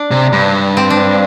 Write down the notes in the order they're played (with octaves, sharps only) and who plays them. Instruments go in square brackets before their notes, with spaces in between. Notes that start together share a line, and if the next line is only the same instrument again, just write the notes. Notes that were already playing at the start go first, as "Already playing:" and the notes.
Already playing: [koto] D4
[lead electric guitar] C3
G2
[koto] C4
D4